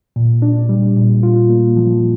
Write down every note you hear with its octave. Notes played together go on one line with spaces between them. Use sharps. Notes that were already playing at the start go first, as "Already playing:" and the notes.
A#2
D4
G3
A#2
F4
A#3
F3